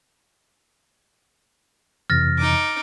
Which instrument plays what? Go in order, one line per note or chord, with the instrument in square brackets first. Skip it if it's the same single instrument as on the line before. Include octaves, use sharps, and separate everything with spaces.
[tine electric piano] F2 C3 E3 [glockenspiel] F6 A6 A#6
[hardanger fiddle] D#4 D6